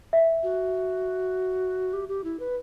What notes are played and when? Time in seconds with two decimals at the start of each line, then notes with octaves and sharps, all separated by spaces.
0.13 E5
0.43 F#4
1.93 G4
2.09 G4
2.24 E4
2.40 B4